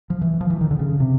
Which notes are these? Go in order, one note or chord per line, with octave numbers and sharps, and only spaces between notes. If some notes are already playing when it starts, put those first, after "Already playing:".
F3
E3
F3
E3
D#3
D3
C#3
C3